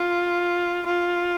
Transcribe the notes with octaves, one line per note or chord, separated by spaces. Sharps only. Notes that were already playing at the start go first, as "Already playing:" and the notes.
Already playing: F4
F4